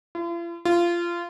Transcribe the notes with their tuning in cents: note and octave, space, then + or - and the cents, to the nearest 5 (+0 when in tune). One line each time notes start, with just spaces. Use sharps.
F4 -45
F4 -20